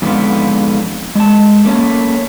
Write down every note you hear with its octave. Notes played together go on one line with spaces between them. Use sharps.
F2 G#2 D3 B3 F4
G#3 A5
A3 A#3 C#4